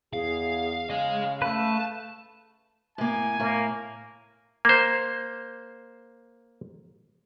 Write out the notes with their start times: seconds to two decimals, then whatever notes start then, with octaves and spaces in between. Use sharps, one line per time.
0.13 E2 G#4 F5
0.90 C#3 G#4 D#5 F5
1.42 A3 B4 A5
2.98 A2 A#3 G#5
3.40 A2 A#3
4.65 A#3 C5